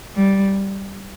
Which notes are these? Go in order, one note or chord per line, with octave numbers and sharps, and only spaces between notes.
G3